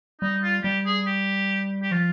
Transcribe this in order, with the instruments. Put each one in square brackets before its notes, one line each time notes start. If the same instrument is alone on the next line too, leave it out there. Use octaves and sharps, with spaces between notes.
[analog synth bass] G3 [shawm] D#4
[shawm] F4
[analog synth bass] G3 [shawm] G4
[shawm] G#4
G4
G4
[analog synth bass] F3 [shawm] F4